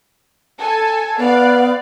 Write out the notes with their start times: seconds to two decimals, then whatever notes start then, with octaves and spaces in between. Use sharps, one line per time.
0.59 A4 G#5 A5
1.18 B3 D5 F5